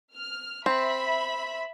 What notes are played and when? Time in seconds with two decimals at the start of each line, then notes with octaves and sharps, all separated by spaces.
0.14 F6
0.66 C4 E5 B5